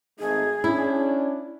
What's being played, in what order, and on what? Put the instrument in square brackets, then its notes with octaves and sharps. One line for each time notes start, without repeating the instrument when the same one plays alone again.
[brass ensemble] G#1 A3 D#4 [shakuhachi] G#4
[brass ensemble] C#4 D4 [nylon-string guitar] E4